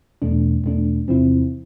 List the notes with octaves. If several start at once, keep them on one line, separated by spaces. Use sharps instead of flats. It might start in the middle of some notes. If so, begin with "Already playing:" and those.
E2 B2 A3 D4
E2 B2 A3 D4
E2 C3 F3 C4 E4